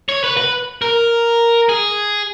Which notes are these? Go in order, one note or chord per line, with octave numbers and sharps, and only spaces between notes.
C#5
B4
B4
A#4
G#4